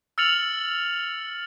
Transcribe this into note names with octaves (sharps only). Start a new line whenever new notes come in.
E6 F6 A6 C#7 F7 F#7